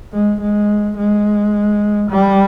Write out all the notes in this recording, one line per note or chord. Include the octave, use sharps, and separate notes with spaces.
G#3
G#3
G#3
G3